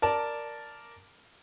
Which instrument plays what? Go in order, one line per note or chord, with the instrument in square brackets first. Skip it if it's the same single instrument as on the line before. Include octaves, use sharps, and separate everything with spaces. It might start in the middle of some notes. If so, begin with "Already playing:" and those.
[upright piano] A#4 D5 A5